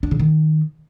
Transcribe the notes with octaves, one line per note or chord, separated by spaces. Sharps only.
D4
C#3
D#3